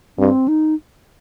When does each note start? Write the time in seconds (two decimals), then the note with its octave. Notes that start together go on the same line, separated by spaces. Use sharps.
0.18 G2 C4
0.48 D#4